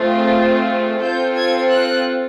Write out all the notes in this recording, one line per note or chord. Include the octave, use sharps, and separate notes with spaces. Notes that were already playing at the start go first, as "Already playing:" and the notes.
Already playing: A3 C4 F4 G#4
C4 F4 A4 G6
G#6
F#6